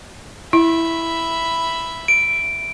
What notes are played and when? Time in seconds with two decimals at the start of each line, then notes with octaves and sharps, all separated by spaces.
0.53 E4 E5 B5
2.08 D7